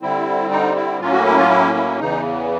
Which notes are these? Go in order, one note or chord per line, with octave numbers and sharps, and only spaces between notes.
D3 G3 C4 E4
D#4
E4
A2 F#3 A#3 C#4 F4
F#4
E4
F4
E4
E4
E2 C#3 E3 D#4